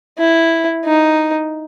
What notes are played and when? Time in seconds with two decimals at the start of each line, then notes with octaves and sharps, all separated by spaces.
0.19 E4
0.86 D#4